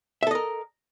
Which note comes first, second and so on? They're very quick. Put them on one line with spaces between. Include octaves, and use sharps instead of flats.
E5 A4 D#5 A#4